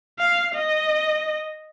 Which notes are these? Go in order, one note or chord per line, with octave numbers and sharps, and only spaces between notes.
F5
D#5